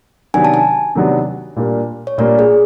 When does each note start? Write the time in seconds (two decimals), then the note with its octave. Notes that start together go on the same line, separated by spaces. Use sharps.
0.34 C3 D#3 F#3 B3 D4 G#5
0.45 A5
0.54 G#5
0.95 C3 D#3 F#3 B3 D4
1.56 A#2 G3 A#3 D4
2.07 C#5
2.18 A#2 G3 A#3 D4 D5
2.39 G#4